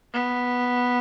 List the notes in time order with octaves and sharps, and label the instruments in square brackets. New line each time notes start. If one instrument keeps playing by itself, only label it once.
[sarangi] B3